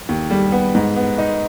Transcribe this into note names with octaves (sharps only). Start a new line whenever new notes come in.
D#2
G3
B3
G#2
B3
D#4